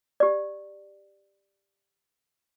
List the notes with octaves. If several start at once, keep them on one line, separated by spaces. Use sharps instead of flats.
G4 D5